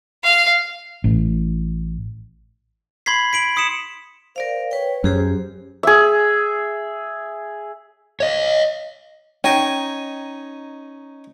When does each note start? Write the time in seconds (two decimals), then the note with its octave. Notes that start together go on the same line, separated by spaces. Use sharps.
0.24 F5
1.04 A1
3.06 B5 C6 G#6 B6 C7
3.33 B6 D7 F#7
3.56 C6 D#6 B6 C#7 E7
4.36 A#4 C5 D5 F5
4.71 B4 C#5 G5
5.04 F#2 G4 G#4 C5
5.83 G#4 E5
8.20 C#5 D#5
9.44 C#4 D#4 G5 G#5